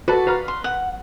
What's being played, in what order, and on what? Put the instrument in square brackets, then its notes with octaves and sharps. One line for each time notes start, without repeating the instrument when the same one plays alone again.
[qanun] F#4 [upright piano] A4 B4 [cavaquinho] D5
[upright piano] B4 A#5 F6 [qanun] F5
[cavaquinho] C6
F#5